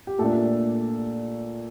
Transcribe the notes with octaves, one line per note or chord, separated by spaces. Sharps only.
G4
A#2 A3 D4 A4